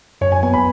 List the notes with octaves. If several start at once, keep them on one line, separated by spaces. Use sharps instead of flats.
F#2 C#5
G#5
B3 G#5
B5